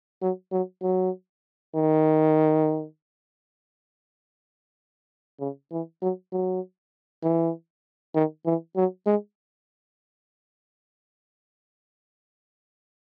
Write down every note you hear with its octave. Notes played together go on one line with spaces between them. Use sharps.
F#3
F#3
F#3
D#3
C#3
E3
F#3
F#3
E3
D#3
E3
F#3
G#3